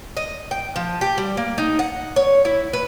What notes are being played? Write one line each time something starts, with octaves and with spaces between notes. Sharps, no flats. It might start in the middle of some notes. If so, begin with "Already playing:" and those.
D#5
G5
F3
G4
G3
A#3
D#4
F#5
C#5
E4
B4